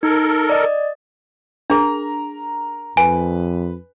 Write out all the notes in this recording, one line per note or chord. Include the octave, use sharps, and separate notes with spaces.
D#4 A4 A#4
D5 D#5
D4 G#4 A#4 A#5
F2 B4 G#5